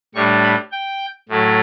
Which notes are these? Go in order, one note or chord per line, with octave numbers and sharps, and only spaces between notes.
A2 G3 D4 C#6
B5
G5
A2 F#3 A3